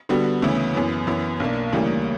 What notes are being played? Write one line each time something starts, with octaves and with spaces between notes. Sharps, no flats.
D3 G3 B3 F#4
D2 C#3 E3 B3 E4
F#2 E3 B3
F#2 E3 B3 E4
B1 B2 A#3 D4
D2 C#3 E3 G3 A#3